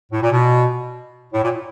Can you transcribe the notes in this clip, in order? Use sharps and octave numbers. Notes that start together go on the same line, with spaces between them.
A2
A#2
B2
A2
A#2